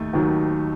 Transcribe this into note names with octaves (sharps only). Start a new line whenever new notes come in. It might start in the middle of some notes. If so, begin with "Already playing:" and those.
Already playing: D#2 D#3 A3
D#2 D#3 F#3